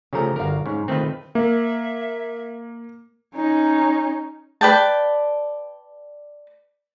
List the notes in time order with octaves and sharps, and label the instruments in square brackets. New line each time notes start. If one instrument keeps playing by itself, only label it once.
[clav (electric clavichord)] C#3 F3 A3 [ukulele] G4 A4 A#5
[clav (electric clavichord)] G1 A#4 [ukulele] D4 F#4 F5
[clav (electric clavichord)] G#2 [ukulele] C#4
[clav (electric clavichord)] D#3 A3 C4 [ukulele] D#4 F4 B4
[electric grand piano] A#3 [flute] E5
[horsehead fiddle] C#4 D#4
[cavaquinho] B4 D5 G5 A5